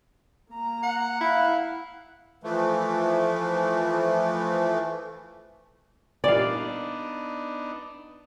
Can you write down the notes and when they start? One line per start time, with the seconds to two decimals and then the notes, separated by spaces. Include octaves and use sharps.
0.51 A#3 A#5
0.83 F#5
1.21 E4 F5 F#5
2.44 E3 F3 A3
6.24 A#2 E3 G3 B3 D4 D#4 D5 F5